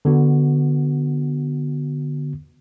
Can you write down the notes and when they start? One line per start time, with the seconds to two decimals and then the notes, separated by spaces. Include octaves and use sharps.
0.05 D3 B3 F#4